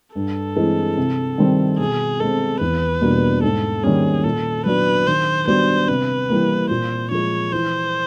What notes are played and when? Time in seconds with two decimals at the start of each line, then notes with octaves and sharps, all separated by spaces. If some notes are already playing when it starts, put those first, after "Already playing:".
0.15 G2 A4
0.56 E3 G#3 C4
0.97 C3
1.38 D#3 G3 C4
1.79 B2 G#4
2.20 G#3 C4 A4
2.60 E2 B4
3.02 B2 G3 A#3 D4
3.43 G#2 A4
3.84 D#3 G3 A#3 C#4 G#4
4.24 A#2 A4
4.66 F#3 B3 D4 F#4 B4
5.06 D#3 C5
5.47 G3 B3 D4 F#4 C5
5.88 C3 B4
6.30 E3 G3 A#3
6.70 A#2 C5
7.11 F3 G#3 C#5
7.52 E3 C5